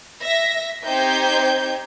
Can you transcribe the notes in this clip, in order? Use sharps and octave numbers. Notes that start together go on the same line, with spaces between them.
E5 A#6
C4 D#4 G4 C5 G6 G#6